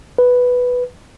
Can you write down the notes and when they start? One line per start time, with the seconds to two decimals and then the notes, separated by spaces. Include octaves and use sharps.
0.18 B4